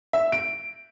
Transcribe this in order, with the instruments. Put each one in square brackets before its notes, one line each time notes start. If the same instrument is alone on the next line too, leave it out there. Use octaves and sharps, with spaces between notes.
[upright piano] E5
D7